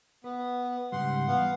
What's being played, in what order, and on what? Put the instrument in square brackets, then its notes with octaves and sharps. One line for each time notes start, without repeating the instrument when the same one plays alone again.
[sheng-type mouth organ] B3 [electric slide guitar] B4
[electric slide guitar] G#2 C#3 G3 [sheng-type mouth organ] F#5 C6
[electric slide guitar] E3 [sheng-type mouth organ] B3 F5 F#5